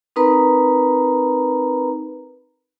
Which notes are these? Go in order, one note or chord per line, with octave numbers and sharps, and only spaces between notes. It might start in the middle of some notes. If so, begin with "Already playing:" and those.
C4 D#4 A#4 B4 A#5 B5